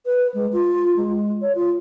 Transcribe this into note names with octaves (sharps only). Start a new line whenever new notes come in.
B4
G#3
F4
G#3
C#5
F4